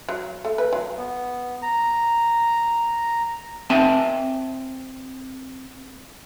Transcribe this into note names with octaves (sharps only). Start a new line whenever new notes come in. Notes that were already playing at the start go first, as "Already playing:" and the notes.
F#3
A3
B4
F#3
B3
A#5
C4 E5 G#5 A5